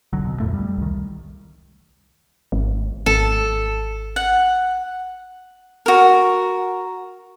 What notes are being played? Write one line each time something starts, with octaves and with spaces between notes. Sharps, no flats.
F1 B1 D3 F#3
B2
D1 F2 A2 A3
G3
C2 D#3
G#1
G#1 A4
F#5
F#4 A#4